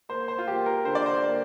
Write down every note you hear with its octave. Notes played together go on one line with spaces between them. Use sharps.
A#3 C5
C5
F4
A#3 G4
A#4
D3 C5
D5
C5
A#3